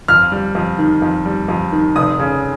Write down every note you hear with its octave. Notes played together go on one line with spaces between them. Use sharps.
F2 F6
G3
F2
D#3
F2
G3
F2
D#3
F1 D#6
C#3